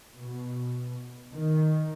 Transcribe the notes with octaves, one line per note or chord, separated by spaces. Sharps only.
B2
D#3